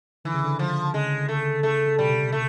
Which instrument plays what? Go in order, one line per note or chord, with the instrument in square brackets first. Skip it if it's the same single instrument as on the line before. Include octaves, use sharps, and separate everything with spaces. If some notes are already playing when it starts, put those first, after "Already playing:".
[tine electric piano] D3 [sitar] E3
[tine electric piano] C#3
D3
[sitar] F3
[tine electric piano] C#3 [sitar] G#3
[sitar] A3
[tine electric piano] C#3 [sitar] A3
[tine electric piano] C#3
[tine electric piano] B2 [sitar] G3
[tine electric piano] C3
[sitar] A3